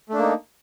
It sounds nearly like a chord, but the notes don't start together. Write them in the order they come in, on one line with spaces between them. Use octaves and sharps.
A3 D4 A#3 D#4